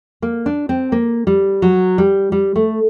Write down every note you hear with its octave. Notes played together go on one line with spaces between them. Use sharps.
A#3
D4
C4
A#3
G3
F#3
G3
G3
A3